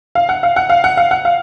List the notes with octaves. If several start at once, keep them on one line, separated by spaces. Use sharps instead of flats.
F5
F#5
F5
F#5
F5
F#5
F5
F#5
F5